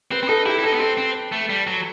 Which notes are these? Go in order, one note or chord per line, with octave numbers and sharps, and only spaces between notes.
C4 B4
C4
D#4 A4
E4 G4
E4
D#4 A4
B3
C4 A4
C4
A3
G3
F#3